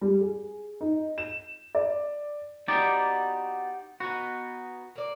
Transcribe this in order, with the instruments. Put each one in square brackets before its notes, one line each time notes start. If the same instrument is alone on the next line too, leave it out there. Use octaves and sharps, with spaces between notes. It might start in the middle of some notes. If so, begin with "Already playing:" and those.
[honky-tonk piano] G3
G#4
D#4
E7
D5
[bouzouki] B3 C4 F#4 [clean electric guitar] D#4 G4 D5
[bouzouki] B3 D#4 [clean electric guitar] F#4
[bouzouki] A#3 D5